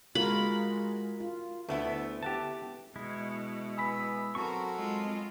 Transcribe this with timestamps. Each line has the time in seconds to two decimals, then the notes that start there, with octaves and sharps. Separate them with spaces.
0.15 G#3 F4 F#4 A#4 B5
1.20 F4
1.69 D2 A3 B3 E4
2.23 G4 F#5 A5
2.96 B2 G#3 E4
3.77 B3 G#5 B5 E6 B6
4.35 F#3 C4 F#4 A4 A#4 C#6
4.75 G#3 F4